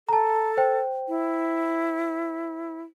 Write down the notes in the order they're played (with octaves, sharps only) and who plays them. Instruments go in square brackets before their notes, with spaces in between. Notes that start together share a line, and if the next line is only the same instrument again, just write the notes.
[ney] A4 [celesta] A5 A#5
[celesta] C5 G5
[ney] E4